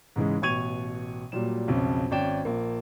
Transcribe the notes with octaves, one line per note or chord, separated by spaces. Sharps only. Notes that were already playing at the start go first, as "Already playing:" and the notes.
G#2 C#3 E3 G#3
A1 B2 C#6 G#6 D#7 F7
A#2 F#3 G3 E7
B1 F2 C#3
G#1 C#4 D5 G5 E7
A#1 A#3